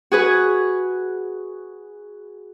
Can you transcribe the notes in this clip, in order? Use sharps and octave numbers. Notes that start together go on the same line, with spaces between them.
F#4 G#4 B4